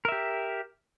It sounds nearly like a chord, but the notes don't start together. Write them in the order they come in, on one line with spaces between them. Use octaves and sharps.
A#4 E5 G4